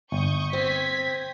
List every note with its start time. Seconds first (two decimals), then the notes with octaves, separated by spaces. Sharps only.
0.12 G1 C#6 D#6 G6
0.53 C4 G#6 B6